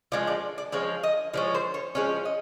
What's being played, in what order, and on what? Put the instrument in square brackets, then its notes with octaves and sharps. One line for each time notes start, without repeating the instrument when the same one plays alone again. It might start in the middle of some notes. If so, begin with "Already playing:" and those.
[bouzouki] F3 G#3 C#4 [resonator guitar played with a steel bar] D5
[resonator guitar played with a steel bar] D5
D5
[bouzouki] F3 G#3 C#4 [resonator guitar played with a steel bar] D5
[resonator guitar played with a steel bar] D#5
[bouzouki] F3 G#3 C#4 [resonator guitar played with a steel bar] D5
[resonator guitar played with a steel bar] C5
C#5
[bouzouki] F3 G#3 C#4 [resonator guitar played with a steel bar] D5
[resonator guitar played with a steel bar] D#5